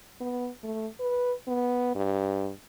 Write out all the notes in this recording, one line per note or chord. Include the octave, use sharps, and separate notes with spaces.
B3
A3
B4
B3
G2